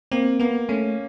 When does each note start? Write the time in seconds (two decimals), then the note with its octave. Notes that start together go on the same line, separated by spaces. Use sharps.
0.12 A#3 C4
0.40 A#3 B3
0.69 A3 C#4